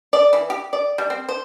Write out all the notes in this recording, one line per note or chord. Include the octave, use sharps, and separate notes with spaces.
D5
E3
G4
D5
G3
C4
C5